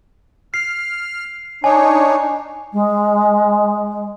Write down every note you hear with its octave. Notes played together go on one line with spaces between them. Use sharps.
F6 C7
D4 D#4 C#5 G#5
G#3